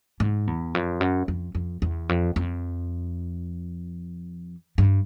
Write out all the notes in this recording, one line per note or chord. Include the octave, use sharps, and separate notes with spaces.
G#2
E2
F2
F#2
F2
F2
E2
F2
F2
G2